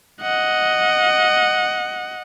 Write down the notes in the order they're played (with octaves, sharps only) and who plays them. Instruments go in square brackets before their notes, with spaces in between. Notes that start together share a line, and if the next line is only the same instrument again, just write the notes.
[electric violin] D#5 F#5